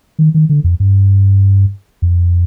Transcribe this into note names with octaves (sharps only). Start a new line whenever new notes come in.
D#3
D#3
D3
F2
G2
F2